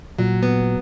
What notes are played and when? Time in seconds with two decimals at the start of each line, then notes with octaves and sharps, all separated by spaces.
0.18 A#2 F#3
0.43 B3